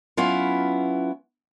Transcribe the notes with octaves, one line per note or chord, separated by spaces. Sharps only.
F#3 B3 C#4 E4 F4